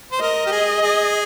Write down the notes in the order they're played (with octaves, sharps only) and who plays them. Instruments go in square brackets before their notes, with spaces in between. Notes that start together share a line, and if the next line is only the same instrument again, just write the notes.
[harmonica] C5
[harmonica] A#4 [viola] D#5
[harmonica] G4
G#4
G#4